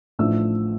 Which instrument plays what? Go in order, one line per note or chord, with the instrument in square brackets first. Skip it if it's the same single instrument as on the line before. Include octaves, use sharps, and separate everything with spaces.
[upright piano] A1 A2 F3 A3 D4 E6